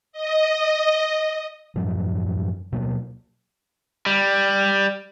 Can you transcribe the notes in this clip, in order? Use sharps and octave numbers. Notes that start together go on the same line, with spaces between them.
D#5
F#2 A2 F3 F#3
B2 F#3 A#3
G3